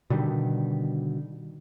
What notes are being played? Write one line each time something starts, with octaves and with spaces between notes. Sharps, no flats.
B2 D3 D#3 G3